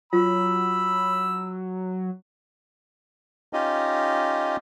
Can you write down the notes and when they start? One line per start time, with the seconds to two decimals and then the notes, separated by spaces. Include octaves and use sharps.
0.13 F#3 F4 B5 E6
3.53 C#4 D#4 F4 G4 D#5